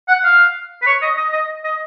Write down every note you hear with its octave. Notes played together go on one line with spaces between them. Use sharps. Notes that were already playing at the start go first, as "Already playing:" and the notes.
F#5
F5
B4
C#5
D#5
D#5
D#5
D#5